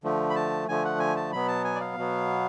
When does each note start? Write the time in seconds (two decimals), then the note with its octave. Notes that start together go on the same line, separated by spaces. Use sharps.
0.04 D3 F3 A3
0.30 B5
0.36 A5
0.68 D3 F3 A3 G#5
0.85 F#5
1.00 G#5
1.16 A5
1.32 B2 F#3 B3 B5
1.48 A5
1.65 G#5
1.75 D5
1.81 F5
1.97 B2 F#3 B3